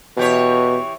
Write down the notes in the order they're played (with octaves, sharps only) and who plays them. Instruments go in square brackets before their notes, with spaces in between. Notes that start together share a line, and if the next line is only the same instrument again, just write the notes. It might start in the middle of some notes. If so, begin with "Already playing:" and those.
[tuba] B2 [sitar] E3 G4 C#5